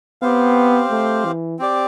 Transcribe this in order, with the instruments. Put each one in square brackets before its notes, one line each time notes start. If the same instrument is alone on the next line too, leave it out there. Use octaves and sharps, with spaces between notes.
[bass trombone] B3 [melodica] C4 G4 C5 F5
[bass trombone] A3
E3
[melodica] C4 G4 D5